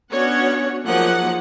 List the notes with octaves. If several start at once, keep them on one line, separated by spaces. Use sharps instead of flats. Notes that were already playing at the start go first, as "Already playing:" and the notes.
B3 C#4 D4 F#4 C#5 F#5
F3 F#3 A#3 D#4 G#4 F#5